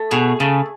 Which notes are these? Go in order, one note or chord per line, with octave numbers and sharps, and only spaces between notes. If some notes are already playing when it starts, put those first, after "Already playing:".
Already playing: A3
B2 G#4
C#3 A3